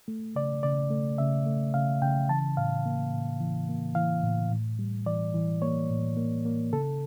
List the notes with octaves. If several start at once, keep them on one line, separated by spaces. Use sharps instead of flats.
A3
C#3 D5
C#3 D5
A3
C#3 E5
A3
C#3 F5
C#3 G5
E3 A5
A2 F5
A#3
A2
E3
A#3
E3 F5
A2
A2
G3
E3 D5
E3
A#3 C#5
A2
A#3
A#3
C#3 A4